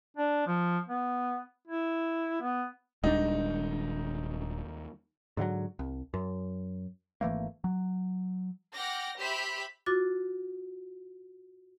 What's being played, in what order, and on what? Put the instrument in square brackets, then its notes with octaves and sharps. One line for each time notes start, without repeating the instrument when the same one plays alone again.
[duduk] D4
F3
B3
E4
B3
[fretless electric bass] D#1 D4 [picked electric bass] D#2 G3 G#3 [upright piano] D#4
[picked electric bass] G#2 D3 F3 F#3
C2
F#2
G#1 E3 A3 A#3
F#3
[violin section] F#5 G5 D6 F6 A#6
G4 C5 E5 B5 B6
[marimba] F4 F#4 D6 A6